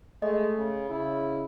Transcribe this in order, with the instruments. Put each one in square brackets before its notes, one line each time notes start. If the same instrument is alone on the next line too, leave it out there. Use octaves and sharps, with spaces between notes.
[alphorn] G#3 [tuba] A3 [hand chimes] D#5
[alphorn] C#3
[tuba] C#3 [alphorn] E4